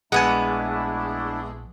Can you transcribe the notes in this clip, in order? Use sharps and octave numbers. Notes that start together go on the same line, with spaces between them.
A#1 G#3 A3 B3 D4 E4 F#5 G#5